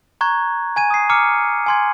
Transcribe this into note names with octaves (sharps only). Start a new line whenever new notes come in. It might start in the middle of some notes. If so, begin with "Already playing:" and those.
A#5 C#6 F#6 G#6
G#5 G#6 D#7
D#6 C7
A#5 D6 F6 C#7
G#5 C6 G#6